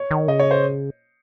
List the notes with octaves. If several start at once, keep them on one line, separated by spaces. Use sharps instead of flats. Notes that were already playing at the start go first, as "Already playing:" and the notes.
Already playing: C#5
D#3
C#3 D#5
C#5
C5